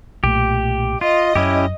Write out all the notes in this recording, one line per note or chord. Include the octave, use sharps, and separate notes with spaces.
B1 A#2 A3 G4
F4 D#5
F#2 C#4 E4 G4